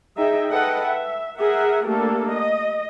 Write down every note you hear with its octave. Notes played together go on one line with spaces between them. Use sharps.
D#4 G#4 D#5 E5 G5
A4 B4 D#5 F#5 G5
E5
G#4 A#4 E5 F#5
A3 A#3 D4 G4 A4
D#5